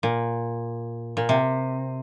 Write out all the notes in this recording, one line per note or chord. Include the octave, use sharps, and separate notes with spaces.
A#2
A#2
C3